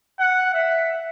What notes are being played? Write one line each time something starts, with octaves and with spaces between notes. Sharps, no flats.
F#5
E5